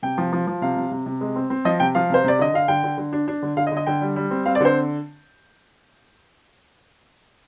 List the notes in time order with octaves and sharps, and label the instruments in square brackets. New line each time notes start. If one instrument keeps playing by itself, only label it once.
[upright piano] C3 G5
F3
F3
F3
C3 F5
C3
C3
C3
G#3
C4
C4
F3 D#5
C3 G5
F3 F5
C3 C5
C3 D5
D3 D#5
D3 F5
D3 G5
D3
D3
D4
D4
D3
D3 F5
D#5
D3
D#5
D3 G5
G3
G3
C4
C4 F5
D5
D3 C5